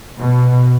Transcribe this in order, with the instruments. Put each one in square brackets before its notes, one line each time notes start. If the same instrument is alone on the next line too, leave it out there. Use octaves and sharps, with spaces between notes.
[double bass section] B2